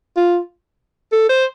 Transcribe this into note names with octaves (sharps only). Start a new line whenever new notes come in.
F4
A4
C5